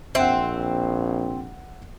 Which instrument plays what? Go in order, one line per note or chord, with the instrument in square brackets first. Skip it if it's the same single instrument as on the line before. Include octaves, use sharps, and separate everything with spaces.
[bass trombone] A#1 [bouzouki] C4 [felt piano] E5 F#5